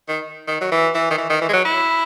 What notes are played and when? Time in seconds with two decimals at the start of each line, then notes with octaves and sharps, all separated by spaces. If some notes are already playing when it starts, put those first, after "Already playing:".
0.08 D#3
0.47 D#3
0.61 F#3
0.72 E3
0.95 E3
1.11 D#3
1.18 E3
1.30 D#3
1.41 E3
1.49 G#3
1.53 F#3
1.65 E4